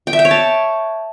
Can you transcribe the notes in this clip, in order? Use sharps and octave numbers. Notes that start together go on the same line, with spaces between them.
G5
E5
G5
C#5
A5